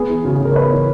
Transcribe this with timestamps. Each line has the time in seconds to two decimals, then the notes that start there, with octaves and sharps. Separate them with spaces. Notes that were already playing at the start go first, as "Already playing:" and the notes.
Already playing: B3 G#4
0.09 E3
0.25 C#3 F#4
0.35 G#4
0.40 C#3
0.45 A#4
0.51 C#5
0.56 B3 B4
0.72 E3 C#5